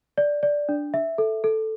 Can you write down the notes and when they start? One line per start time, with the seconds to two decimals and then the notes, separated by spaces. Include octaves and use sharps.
0.18 D5
0.43 D5
0.69 D4
0.94 E5
1.18 A4
1.44 A4